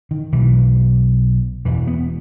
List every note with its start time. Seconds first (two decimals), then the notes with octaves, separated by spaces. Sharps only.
0.11 D#3
0.32 B1 B2 E3
1.65 E1 E2 B2 E3
1.87 B3